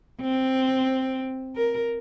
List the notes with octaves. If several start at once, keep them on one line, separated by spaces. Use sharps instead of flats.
C4
A#4